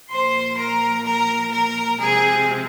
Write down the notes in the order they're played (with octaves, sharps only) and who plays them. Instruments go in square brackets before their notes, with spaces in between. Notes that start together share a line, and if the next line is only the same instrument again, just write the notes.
[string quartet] A#2 F3 A#3 C5 C6
A#4 A#5
A#4 A#5
A#4 A#5
C3 F3 G#3 C4 G#4 G#5